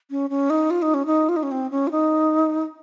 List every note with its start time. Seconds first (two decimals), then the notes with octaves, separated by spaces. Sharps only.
0.11 C#4
0.30 C#4
0.50 D#4
0.70 F4
0.82 D#4
0.94 C#4
1.06 D#4
1.29 F4
1.36 D#4
1.43 C#4
1.51 C4
1.71 C#4
1.87 F4
1.91 D#4